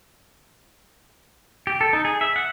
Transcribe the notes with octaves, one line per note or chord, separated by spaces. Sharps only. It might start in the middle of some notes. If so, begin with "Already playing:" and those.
G4
A4
D#4
G#4
E5
F#5